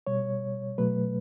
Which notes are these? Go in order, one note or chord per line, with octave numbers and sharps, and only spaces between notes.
B2 G3 C#5
B2 F#3 A3 B4